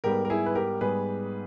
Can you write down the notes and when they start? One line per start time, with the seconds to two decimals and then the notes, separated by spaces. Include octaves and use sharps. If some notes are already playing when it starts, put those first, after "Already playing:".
0.04 G#2 G3 B3 G4 A#4
0.25 A#4
0.30 E4 G#4
0.46 B4
0.55 G4 A#4
0.81 G#2 G3 B3 G#4 B4